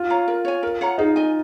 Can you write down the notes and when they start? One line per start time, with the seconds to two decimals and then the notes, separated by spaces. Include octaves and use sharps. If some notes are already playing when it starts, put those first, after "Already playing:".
Already playing: F4
0.10 C#5 F5 A#5
0.28 A#4
0.45 C#5 G#5
0.63 A#4
0.81 C#5 F#5 A#5
0.98 D#4 G#4
1.16 D#5 G#5